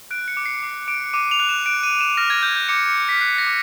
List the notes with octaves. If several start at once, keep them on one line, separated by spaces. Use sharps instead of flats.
F#6 D7
C#7
D6
C7
D6
D6 D7
D6 D#7
F7
F#6
E7
F#6 D7
D#7
F#6
E7
F6 A#6
G#6
F6 G6
G6
D6 C#7
F6
B6
F#6 C7
A#6
D6